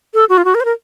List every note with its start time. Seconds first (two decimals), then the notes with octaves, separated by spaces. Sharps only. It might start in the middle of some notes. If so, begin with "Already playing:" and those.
0.14 A4
0.29 F#4
0.38 F4
0.45 F#4
0.55 A#4
0.60 C5
0.65 A#4